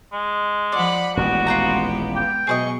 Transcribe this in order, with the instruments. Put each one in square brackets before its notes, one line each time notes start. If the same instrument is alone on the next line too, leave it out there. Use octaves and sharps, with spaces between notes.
[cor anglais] G#3
[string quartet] F3 F#5 B5 [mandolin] D5
[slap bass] D#1 A1 [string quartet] G#3 B3 G4 [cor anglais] F#4
[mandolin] F4 F#5 A#5
[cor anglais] G5
[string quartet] B2 F#3 C#6 [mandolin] G#4 B4 D#5